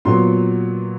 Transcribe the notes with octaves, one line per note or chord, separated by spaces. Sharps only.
A#2 F#3 B3 C6